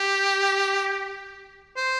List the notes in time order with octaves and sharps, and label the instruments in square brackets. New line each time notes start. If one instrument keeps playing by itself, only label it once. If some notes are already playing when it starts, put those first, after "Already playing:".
Already playing: [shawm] G4
C5